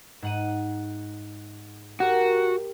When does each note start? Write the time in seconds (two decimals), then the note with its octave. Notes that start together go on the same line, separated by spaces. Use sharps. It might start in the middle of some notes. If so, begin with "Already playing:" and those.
0.22 G#2 F#5 D#7
2.00 F#4 G4 A#4